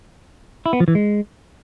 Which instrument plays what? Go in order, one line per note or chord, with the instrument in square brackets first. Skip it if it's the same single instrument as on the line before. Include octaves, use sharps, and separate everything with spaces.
[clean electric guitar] E4
B3
F3
E3
G#3